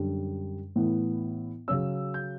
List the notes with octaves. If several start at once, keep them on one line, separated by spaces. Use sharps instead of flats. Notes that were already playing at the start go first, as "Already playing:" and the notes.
Already playing: F#2 D3 G3
A2 E3 B3
C#3 F#3 C#4 E6
G6